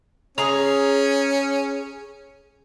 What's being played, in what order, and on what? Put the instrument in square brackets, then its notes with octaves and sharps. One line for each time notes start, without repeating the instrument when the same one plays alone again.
[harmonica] C#4 [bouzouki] G#4 A#5